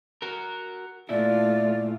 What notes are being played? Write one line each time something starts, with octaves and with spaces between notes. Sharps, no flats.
F#4 A#4
A#2 A3 E4 F4 D5